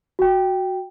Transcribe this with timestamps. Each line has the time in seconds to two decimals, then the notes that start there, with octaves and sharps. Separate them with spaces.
0.19 F#4 G5